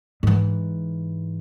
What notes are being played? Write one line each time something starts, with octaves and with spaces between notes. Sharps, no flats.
G#2 E3